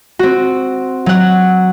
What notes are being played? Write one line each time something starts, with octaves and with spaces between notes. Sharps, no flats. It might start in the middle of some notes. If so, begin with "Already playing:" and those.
C4 F#4
F#3 F#5